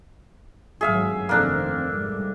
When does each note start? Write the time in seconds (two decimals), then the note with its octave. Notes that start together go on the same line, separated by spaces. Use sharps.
0.81 G#1 G2 F#3 G#4 E5 F5
1.29 F1 D#3 A#3 C4 D4 A4
1.93 G#2 G3